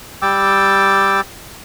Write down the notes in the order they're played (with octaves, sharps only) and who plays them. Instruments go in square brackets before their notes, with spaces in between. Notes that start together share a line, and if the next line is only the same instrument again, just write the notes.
[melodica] G3 G5 D6 E6